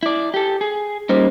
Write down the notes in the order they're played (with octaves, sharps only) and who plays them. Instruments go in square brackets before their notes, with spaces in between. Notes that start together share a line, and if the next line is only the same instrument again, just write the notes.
[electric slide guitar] E4 D5
G4 A4
G#4
[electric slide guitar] G3 A#3 D#4 [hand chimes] C#4 C5